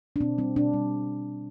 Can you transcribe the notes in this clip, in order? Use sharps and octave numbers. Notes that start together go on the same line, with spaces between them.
D4
B2 C4
G3 C4
B2 D4
G3